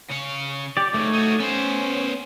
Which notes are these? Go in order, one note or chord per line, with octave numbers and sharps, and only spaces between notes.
C#3 C#5
G4 D5
G#2 D#3 A3 C#5
D#4 F#4
B3 C#4 C5